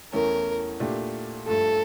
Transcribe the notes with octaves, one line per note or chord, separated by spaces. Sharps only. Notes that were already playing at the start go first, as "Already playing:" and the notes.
E2 E3 A3 C#4 A#4
A#2 A3 D4 G4
G2 F3 A3 A4